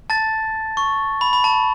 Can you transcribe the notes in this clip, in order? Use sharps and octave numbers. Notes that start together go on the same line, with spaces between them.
A5 A6
C#6
B5
B5
A5